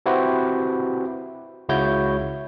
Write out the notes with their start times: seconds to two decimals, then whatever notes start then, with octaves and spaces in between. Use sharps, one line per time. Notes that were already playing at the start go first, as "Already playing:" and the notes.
0.06 C4 E4 F#4 G4 B4 C5
1.69 C#2 C#3 E4 F#4 C#5 G6